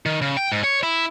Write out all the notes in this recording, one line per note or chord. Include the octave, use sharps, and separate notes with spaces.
D#3
C#3
G5
G#2
C#5
E4